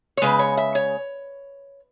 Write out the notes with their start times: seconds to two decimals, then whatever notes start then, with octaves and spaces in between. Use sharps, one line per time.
0.17 C#5
0.22 C#3 G#3 B4
0.39 C#5
0.57 E5
0.75 C#5